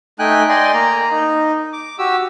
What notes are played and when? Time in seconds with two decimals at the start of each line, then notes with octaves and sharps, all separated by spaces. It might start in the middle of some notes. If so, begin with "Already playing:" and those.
0.19 A3 D#4 G5 G#5 F#6
0.49 D5 D#5 G5 G#5 C6
0.73 A#3 A#5
1.11 D#4
1.73 D6
1.99 F#4 G4 E6